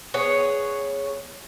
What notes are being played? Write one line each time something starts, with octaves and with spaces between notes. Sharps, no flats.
B3 G#4 C#5